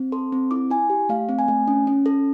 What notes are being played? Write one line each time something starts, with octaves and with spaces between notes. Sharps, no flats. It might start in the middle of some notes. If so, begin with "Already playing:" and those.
Already playing: C4
A4 C6
C4
E4 D6
E4 G#5
G4
A3 F5
C4
G#5
A3
C#4
C#4
A4